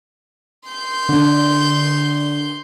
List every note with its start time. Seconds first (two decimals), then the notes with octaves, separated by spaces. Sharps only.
0.69 C6 G6
1.09 D3